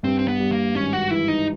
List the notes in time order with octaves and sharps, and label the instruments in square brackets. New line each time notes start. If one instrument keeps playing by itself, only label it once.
[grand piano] G2 [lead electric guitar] C4
[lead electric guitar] C4
B3
[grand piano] G3
[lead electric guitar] A#3
[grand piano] G#1 [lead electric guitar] C#4
[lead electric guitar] F#4
[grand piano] E3 [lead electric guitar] E4
[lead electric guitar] D#4